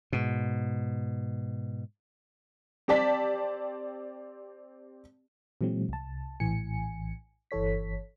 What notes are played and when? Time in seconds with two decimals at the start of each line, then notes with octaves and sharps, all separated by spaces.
0.13 G#2 B2
2.88 C4 G4 D5 A5 B6
5.61 A#2 E3 F#3 G#3 C4
5.89 C2 A5
6.40 A#1 A2 E3 G#5 C#7
7.51 G1 E3 A4 C#5 B6